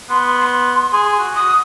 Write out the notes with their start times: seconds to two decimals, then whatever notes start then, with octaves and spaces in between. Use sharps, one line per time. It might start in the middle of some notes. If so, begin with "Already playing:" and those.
0.10 B3 C6
0.40 C6
0.93 G#4
1.19 F#4
1.35 F#4 D#6